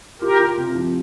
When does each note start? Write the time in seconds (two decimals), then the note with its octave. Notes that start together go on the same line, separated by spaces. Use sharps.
0.21 F4 G4 A#4
0.39 F4
0.57 C3
0.75 F3